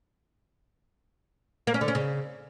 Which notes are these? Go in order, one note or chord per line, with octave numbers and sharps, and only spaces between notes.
A#3
C#4
D3
C#4
C#3